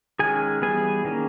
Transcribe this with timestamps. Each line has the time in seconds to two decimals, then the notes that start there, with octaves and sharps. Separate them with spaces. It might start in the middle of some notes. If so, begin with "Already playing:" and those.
0.19 D#3 G#3 C#4 G#4 G#5
0.62 E3 G3 B3 G#4 G#5
1.05 D#3 A#3 C#4